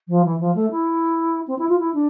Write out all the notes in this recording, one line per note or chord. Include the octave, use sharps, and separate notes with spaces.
F3
E3
F3
A3
E4
C4
E4
F4
E4
D4